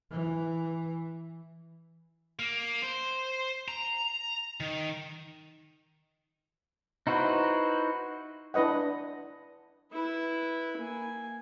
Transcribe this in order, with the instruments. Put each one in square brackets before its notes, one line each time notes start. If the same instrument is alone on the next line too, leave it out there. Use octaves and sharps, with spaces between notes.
[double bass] E3
[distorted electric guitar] A#3
C5
A#5
D#3
[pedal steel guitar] D#4 E4 F#4 B4 C5
[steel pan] D4 E4 B4 D#5 F#5
[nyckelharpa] E4 B4
A#3 G#5